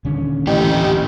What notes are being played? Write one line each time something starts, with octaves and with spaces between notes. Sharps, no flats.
D#1 D3 C#4
A1 A3 G4